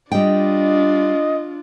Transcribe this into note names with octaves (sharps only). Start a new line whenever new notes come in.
G3 D4 F4 D#5 G5